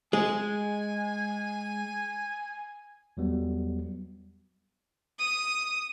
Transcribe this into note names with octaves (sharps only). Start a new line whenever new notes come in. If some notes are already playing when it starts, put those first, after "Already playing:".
G#3 G#5
E2 F#3 G3 B3
D#6